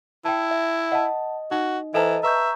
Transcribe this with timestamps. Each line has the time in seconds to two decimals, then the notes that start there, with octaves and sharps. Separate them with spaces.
0.25 E4 G5 A5
0.51 E5
0.92 D#5 F#5 A5
1.51 D#4 F#4
1.94 E3 A4 C5 D#5 A5 A#5
2.23 B4 E5 A#5 C#6 G6